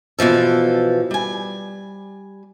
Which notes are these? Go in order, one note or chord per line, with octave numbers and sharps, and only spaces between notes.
B2 E3 F3 A4
G3 G#5